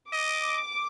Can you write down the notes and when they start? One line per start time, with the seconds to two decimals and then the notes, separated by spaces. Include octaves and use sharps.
0.12 D#5 D6